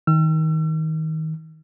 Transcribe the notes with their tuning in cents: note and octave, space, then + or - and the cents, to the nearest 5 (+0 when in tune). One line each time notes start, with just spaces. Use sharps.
D#3 +25 E6 +40